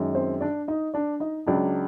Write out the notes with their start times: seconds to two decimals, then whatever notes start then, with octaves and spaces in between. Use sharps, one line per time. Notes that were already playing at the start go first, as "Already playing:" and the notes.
Already playing: F#2 D#3 G#3
0.15 C4 C5
0.41 D4 D5
0.68 D#4 D#5
0.94 D4 D5
1.20 D#4 D#5
1.46 C#2 C#3 F#3 D4 D5